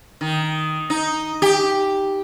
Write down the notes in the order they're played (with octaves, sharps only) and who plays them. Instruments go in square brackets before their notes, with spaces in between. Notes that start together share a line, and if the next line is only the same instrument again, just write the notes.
[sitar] D#3
D#4
G4